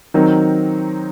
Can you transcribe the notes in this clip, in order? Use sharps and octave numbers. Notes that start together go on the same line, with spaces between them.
D#3 F#3 C4 D#4